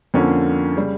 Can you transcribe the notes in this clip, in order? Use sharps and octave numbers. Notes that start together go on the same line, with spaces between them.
F2 D3 F3 A#3 C#4
C#3 G3